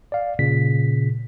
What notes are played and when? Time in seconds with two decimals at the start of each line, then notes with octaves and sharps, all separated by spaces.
0.12 D5 F5
0.39 A#2 C#3 B6